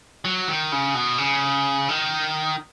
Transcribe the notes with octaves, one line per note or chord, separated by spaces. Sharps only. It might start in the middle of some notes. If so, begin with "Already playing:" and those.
F#3
D#3
C#3
B2
C#3
D#3